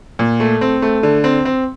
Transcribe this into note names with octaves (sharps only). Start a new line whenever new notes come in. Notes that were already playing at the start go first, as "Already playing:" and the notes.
A#2
A3
C4
A3
D3
C4
C4